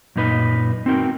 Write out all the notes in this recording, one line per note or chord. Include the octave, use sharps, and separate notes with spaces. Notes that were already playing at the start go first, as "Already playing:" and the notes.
F#2 A#2 D#4 B4 D#5
C4 D#4 F#4 A#4 G5